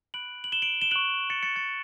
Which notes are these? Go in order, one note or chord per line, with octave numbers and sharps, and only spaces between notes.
B5 F#6 D7 F#7
F#7
E7 G7
D7 F#7
E7 G7
C#6 F#6 D7 F#7
A6 C#7
A6 C#7
A6 C#7